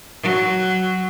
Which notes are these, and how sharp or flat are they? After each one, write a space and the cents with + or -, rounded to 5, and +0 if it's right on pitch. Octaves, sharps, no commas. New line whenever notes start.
F#3 +5